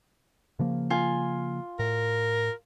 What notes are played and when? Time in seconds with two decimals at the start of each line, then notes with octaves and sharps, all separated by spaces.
0.59 C#3 F3 A#3
0.90 F4 G#5
1.79 A2 A#4